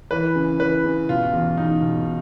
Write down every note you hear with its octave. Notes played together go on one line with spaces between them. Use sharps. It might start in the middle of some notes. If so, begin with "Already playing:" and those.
E3 B4
C#3
E3 B4
C#3
B2 F4
E2
E2 D#4
B2